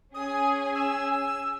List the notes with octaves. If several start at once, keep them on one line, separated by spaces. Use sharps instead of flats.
C#4 G#4 G#5 D#6
E6